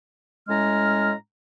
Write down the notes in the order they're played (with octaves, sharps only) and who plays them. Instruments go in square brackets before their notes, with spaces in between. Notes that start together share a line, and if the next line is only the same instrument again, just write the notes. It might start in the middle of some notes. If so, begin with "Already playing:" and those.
[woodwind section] A2 G#3 C#4 A#5 F6